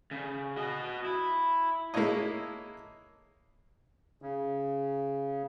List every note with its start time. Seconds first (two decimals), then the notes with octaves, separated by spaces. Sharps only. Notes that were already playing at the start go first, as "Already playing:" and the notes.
0.11 C#3
0.56 F#4 D#5
1.05 E4
1.94 G#3 A#3 E4 A4 C#5 D#5
4.22 C#3